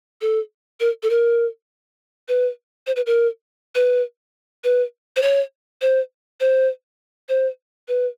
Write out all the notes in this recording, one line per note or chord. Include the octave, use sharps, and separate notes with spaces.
A4
A#4
A4
A#4
B4
C5
B4
A#4
B4
B4
C5
C#5
C5
C5
C5
B4